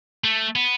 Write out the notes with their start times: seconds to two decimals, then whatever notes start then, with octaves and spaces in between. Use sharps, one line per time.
0.24 A3
0.56 B3